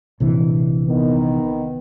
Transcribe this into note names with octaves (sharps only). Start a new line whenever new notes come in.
A#1 C3 E3
D#3 B3